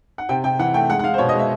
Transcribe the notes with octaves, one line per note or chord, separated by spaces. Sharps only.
F#5
C3 G5
C3 G5
E3 F#5
A3 G5
G#3 F#5
F#5
G#3 F5
C5
B2 C#5
D#5
G#3 E5